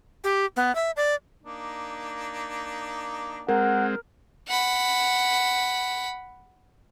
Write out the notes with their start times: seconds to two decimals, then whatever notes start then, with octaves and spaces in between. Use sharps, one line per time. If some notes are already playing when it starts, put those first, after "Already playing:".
0.24 G4
0.56 B3
0.75 E5
0.97 D5
1.44 A#3 D4 D#4
3.49 G#3 C4 A#4 F#5
4.48 F#5 B5